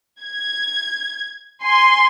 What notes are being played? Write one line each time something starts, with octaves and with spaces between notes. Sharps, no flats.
G#6
G#5 C6